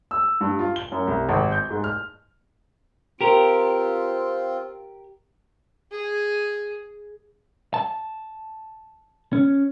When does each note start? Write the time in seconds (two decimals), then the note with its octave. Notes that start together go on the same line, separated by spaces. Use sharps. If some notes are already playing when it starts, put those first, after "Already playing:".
0.11 E6
0.41 G2
0.59 F4
0.76 G7
0.92 F#2
1.07 C2
1.29 G#1
1.52 G6
1.71 G#2
1.84 F6
3.21 C4 F4 G4 A#4
5.91 G#4
7.74 A5
9.33 C#4